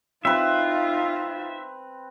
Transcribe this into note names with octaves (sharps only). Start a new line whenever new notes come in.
C4 D#4 F4 B4 E5